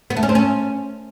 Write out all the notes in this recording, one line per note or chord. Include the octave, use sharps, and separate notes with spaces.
B3
A3
C#4
C4
C#4